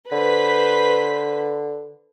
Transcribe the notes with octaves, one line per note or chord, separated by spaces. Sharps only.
D3 B4 C5 B6